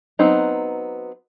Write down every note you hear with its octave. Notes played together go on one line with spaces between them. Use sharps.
F#3 B3 C4 D#4